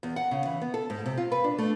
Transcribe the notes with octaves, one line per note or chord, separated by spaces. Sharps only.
E2
F#5
C#3
E3
B3
A4
G#2
C3
F4
B4
D4
A3